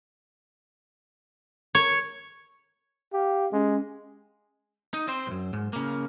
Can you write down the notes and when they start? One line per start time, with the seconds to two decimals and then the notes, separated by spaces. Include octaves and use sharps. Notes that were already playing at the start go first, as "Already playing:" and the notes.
1.75 C#5
3.13 G4 F5
3.52 G#3 C#4
4.94 D#4
5.08 C4 C5
5.27 B1 F#2
5.53 G#2
5.73 C#3 A#3